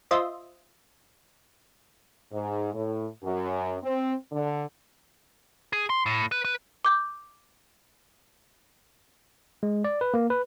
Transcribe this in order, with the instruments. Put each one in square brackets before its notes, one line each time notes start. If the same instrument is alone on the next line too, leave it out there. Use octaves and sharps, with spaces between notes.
[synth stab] F4 C5 D#5 E5
[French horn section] G#2
A2
F#2
C4
D3
[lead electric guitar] G#4
C6
A2
B4
B4
[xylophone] D6 G6
[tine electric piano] G#3
D5
B4
A#3
B4